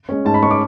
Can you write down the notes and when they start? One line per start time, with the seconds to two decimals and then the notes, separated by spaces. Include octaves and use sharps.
0.09 G#3 C#4
0.25 G#2 A5
0.34 B5
0.43 G#3 C#4 C#6
0.51 D6